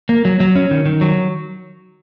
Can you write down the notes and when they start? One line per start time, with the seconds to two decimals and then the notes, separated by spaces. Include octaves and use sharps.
0.09 A#3
0.25 F#3
0.40 F#3
0.56 C#4
0.71 D#3
0.86 D#3
1.01 F#3